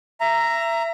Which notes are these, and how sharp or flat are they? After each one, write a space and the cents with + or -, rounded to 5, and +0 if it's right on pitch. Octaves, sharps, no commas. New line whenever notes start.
E5 +25 A#5 -5